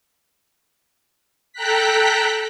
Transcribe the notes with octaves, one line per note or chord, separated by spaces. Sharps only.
A4 G5 A#5 F#6 B6